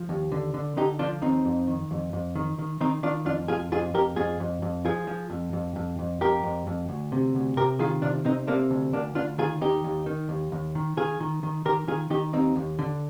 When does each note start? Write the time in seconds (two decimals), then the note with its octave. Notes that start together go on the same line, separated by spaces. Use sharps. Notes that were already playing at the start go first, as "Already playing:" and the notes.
Already playing: F3
0.09 D#2
0.32 D3
0.54 D3
0.77 D3 D#4 G4
0.99 F3 D4 F4
1.22 D#2 C4 D#4
1.45 F2
1.68 D#3
1.91 F2
2.13 F2
2.36 D#3
2.59 D#3
2.81 D#3 C4 D#4
3.03 D#3 D4 F4
3.26 F2 D4 F4
3.48 F2 F4 G#4
3.72 F2 F4 G#4
3.94 F2 G4 A#4
4.16 F2 F4 G#4
4.40 F2
4.62 F2
4.85 F3 F4 G#4
5.07 F3
5.30 F2
5.53 F2
5.76 F2
5.99 F2
6.21 F2 G4 A#4
6.43 F2
6.67 F2
6.89 D2
7.12 C3
7.35 D2
7.57 C3 G4 A#4
7.79 D#3 F4 G#4
8.02 C3 D4 F4
8.25 C3 C4 D#4
8.47 C3 A#3 D4
8.71 D2
8.93 D2 A#3 D4
9.15 D2 D4 F4
9.38 D#3 F4 G#4
9.62 D#2 D#4 G4
9.84 D#2
10.06 D#3
10.29 D#2
10.52 D#2
10.75 D#3
10.97 D#3 F4 G#4
11.20 D#3
11.43 D#3
11.65 D#3 G4 A#4
11.88 D#3 F4 G#4
12.10 D#3 D#4 G4
12.33 D#2 C4 D#4
12.56 D#2
12.79 D3